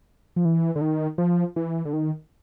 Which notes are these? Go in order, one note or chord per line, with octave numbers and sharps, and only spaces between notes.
F3
E3
D3
D#3
F3
E3
D3
D#3